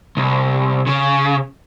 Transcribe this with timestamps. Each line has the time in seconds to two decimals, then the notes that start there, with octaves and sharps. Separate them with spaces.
0.17 C2
0.87 C#3